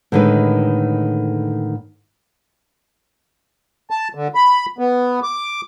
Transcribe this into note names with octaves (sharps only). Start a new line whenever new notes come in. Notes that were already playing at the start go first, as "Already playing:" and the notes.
A2 D3 D#3 G#3 B4
A5
D3
B5
B3
D6